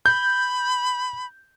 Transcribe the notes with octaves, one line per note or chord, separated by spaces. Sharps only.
B5 G6